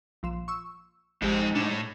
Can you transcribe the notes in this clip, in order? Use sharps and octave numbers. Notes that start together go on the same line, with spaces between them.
A#1 F3 E7
C#6 E6
G#1 F2 G#2 C4 G4
A2 D4